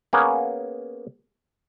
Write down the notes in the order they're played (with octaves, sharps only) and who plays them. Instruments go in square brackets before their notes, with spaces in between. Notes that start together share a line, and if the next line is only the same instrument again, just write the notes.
[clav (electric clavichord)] A#3 B3 C#4 G#4 A#4